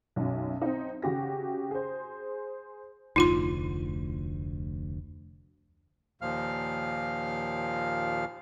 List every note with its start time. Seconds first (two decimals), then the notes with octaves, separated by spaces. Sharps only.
0.16 B1 F#2
0.62 C4 D#4
1.02 C#3 F#4 G4 A#6
1.71 G#4 C5
3.16 F1 D2 D#4 F4 C6
6.21 D#2 A#2 F3 F5 F6